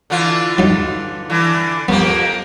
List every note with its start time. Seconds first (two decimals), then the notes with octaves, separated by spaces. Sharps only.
0.10 D3 E3 F4
0.58 F#3 D#4
1.30 D3 E3
1.88 F2 A#3 B3 G4